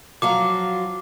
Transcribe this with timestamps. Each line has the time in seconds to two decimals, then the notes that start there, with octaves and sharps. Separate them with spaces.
0.22 F3 F#3 F4 D6